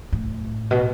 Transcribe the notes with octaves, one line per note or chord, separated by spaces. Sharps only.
A2
B2